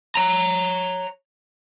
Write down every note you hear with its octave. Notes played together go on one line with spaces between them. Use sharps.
C#5 A#5